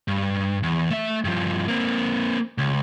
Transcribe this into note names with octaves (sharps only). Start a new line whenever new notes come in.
G2
E2
A3 E5
G2 F3
A#3 C4
C#2